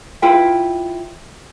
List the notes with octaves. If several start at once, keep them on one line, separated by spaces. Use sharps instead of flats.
E4 F4 B4 G5